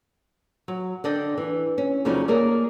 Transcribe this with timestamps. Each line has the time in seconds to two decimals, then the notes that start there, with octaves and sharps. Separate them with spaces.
0.68 F#3
1.04 D3 D4 D#5 G5
1.38 E3
1.78 C#4
2.05 F2 C#3 F#3 C#4 D#4 D5
2.28 A3 A#3 G#4 A#4 C#5 D5